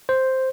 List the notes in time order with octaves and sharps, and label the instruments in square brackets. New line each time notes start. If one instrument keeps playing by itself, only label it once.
[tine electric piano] C5